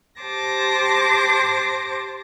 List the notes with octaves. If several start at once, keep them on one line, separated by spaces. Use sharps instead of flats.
G4 C5 A5 D6 A#6